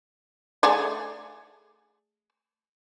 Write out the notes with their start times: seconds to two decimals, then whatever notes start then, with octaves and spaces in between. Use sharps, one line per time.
0.63 A3 G#4 D5